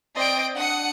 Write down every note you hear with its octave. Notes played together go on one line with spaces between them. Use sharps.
C4 D5 D#5 G5 D7
D4 F#5 D#6 C#7